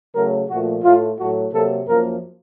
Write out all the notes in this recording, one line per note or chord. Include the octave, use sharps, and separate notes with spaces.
C#3 F#3 A3 A#4
A#2 F3 A3 F#4
A2 A3 F4
A2 F#3 A3 F#4
C3 F#3 A#3 A4
F#2 F3 A#3 A#4